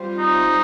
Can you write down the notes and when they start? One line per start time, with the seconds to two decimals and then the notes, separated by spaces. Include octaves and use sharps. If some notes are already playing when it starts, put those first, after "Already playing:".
Already playing: G3 C4 F4 C5
0.19 D#4